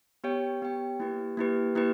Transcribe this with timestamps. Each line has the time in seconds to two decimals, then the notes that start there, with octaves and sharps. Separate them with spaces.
0.24 B3 G4 C#5 G5
0.62 B3 G4 C#5 G5
1.00 A#3 E4 G4 B4
1.37 A#3 E4 G4 B4
1.75 A#3 E4 G4 B4